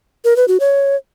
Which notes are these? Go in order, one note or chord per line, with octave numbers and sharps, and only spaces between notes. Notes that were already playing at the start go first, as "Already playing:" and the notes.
A#4
B4
F#4
C#5